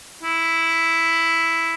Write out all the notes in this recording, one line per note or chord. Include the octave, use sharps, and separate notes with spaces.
E4